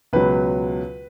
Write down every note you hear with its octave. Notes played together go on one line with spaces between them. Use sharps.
C#2 B2 F#3 B4